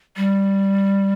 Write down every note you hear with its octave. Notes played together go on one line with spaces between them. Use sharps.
G3